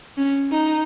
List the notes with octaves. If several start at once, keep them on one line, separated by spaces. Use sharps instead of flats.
C#4
D#4